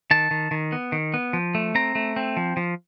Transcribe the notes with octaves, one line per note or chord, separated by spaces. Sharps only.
D#3 A5
D#3
D#3
B3
D#3
B3
F3
A3
C4 A#5
A3
C4
F3
F3